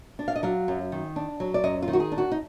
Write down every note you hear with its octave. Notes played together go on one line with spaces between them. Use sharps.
D4
F5
D#5
F#3 F5
F#2
D#3
D4
F#3
D5
F#2 D#5
F4
D#3
F#4
G#4
D4
F#4
D#4